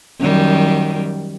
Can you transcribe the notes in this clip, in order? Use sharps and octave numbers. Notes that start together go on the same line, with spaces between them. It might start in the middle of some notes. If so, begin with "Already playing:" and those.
F#2 D#3 G3